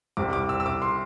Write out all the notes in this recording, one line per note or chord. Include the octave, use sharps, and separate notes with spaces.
C2 C3 G3 D6
D6
E6
E6
D6
C6